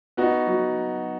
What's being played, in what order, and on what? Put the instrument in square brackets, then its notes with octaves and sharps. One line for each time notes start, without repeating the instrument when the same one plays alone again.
[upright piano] B3 [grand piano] D#4 F#4
[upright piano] F#3